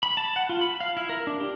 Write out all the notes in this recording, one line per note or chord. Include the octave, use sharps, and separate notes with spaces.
B5
A5
F#5
F4
B5
F5
E4
A#4
D4
G4